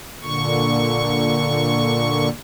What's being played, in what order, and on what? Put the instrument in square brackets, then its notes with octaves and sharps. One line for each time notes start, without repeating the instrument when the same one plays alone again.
[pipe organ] A#2 D3 C#6